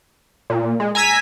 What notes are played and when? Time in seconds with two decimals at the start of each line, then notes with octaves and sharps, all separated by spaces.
0.50 A#2
0.80 G#3
0.95 G#5 A#5 E6 G#6 B6